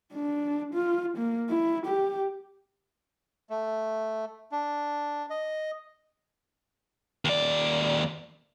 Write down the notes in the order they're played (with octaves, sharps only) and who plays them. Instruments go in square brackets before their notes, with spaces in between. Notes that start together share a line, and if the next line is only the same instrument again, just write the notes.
[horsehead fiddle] D4
F4
A#3
E4
G4
[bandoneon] A3
D4
D#5
[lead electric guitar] D#2 D5